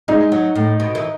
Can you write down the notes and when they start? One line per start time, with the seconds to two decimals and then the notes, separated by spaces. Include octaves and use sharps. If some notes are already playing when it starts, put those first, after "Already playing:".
0.08 G#3 D#4
0.32 F#3
0.56 A2
0.80 B2
0.95 E3